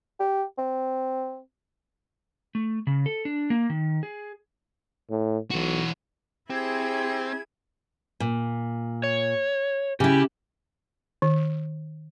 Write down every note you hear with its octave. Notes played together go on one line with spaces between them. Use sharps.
G4
C4
A3
C#3
A4
D4
A#3
D#3
G#4
A2
B1 E3 F#4
C4 E4 G4 G#4 G#6
A#2
C#5
C#3 E4 G4
D#3